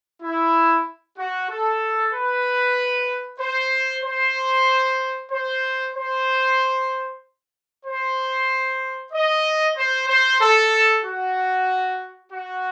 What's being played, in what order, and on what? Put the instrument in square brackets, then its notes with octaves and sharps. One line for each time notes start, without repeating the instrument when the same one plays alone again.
[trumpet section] E4
F#4
A4
B4
C5
C5
C5
C5
C5
D#5
C5
C5
A4
F#4
F#4